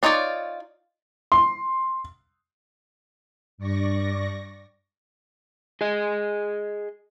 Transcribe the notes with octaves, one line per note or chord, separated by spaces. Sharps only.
D4 D#4 F4 C#5 D5
C6
G2 D5 C#6 A#6
G#4 D#5